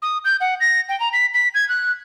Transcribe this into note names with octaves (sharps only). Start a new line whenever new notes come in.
D#6
G6
F#5
A#6
G5
A#5
B6
B6
G#6
F#6